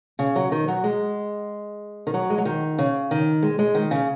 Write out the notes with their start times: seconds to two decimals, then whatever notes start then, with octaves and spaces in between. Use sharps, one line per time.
0.19 C#3
0.36 F#3
0.52 D#3
0.68 F#3
0.84 G#3
2.07 D#3
2.14 F#3
2.30 G#3
2.38 F#3
2.45 D#3
2.78 C#3
3.11 D#3
3.43 G#3
3.59 G#3
3.75 D#3
3.91 C#3